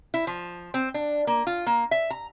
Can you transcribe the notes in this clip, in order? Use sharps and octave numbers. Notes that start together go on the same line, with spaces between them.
E4
F3
C4
D4
A#3
F4
A#3
E5
A#5